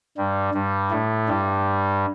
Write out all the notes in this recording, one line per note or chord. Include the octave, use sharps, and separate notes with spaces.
G2 G3
G2 G3
A2 A3
G2 G3